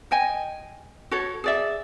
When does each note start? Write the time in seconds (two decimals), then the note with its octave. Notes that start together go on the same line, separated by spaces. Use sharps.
0.11 D#5 G5 G#5
1.11 F#4 A4 C#5
1.44 G#4 D5 E5